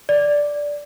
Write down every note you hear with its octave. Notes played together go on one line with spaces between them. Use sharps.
D5